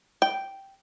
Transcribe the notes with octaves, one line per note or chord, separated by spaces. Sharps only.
G5